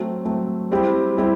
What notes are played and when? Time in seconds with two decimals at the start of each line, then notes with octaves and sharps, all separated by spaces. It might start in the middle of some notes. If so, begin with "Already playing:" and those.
Already playing: F#3 A3 C4
0.25 F#3 A3 C4
0.71 G3 C4 E4 G4
1.17 G3 C4 E4 G4